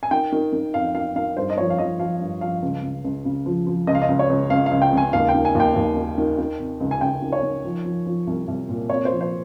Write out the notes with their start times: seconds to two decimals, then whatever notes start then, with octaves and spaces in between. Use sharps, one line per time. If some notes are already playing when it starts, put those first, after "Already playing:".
0.03 G#5
0.11 D#3 G5
0.32 D#3
0.53 D#3
0.74 F2 F5
0.95 D#3 F5
1.16 D#3 F5
1.37 G2 C5
1.50 D#5
1.58 F3 C#5
1.70 F5
1.78 F3 D#5
1.99 F3 F5
2.20 G2
2.41 F3 F5
2.62 C#2
2.83 C#2
3.04 C#2
3.25 C#3
3.46 F3
3.67 F3
3.87 C#2 D#5
3.95 F5
4.02 D#5
4.08 C#2
4.19 C#5
4.30 C#2
4.50 C#2 F5
4.66 C#2 F5
4.82 G5
4.93 C#2 G#5
5.13 D#2 F5
5.29 G5
5.34 D#3
5.45 G#5
5.55 D#2 G5
5.76 D#2
5.97 D#3
6.18 D#3
6.38 D#3
6.59 C3
6.80 C#2
6.91 G#5
7.01 C#2 G5
7.22 D#3
7.32 C#5
7.43 D#3
7.64 F3
7.85 F3
8.06 F3
8.27 C2
8.48 C2
8.69 A#2
8.89 C3 C#5
9.05 C5
9.11 F3
9.21 C5